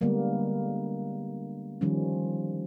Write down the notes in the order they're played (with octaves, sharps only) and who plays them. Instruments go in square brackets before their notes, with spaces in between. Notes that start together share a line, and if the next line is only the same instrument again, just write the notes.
[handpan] D3 G3 G#3 A#3 B3
D#3 F3 G3 C#4